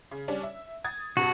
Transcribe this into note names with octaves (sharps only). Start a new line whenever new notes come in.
C#3
G3 C#4 D4
E5
D#6 G#6 A6
C2 G2 F#4